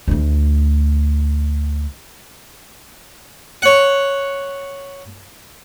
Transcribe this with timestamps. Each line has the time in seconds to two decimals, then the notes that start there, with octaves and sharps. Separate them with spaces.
0.08 D2 A3
3.62 C#5 F#5